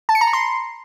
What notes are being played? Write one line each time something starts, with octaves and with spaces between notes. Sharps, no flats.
A5
C#7
A#5
B5
C6